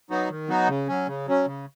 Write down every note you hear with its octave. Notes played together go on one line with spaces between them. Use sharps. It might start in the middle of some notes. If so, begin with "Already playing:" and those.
F#3 B3 D#4 F#4
D#3
F#3 B3 D#4 F#4
C#3
F#3 C#4
C#3
F#3 C#4
C#3